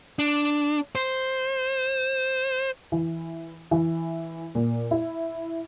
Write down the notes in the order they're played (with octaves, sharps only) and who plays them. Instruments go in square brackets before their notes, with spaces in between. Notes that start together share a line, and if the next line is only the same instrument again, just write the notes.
[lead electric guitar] D4
C5
[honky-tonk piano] E3
E3
A#2
E4